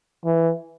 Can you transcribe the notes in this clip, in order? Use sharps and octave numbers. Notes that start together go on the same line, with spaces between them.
E3